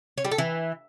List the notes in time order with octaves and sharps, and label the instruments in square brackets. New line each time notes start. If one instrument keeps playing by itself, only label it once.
[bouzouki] C#4
G3
A4
E3